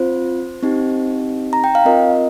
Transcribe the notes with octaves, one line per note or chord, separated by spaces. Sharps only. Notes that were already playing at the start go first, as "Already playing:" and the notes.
Already playing: C4 F4 C5
C4 D#4 G4
A#5
G5
F5
C4 F4 A#4 D#5